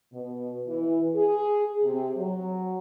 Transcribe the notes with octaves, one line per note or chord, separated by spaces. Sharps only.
B2
E3
G#4
C3
F#3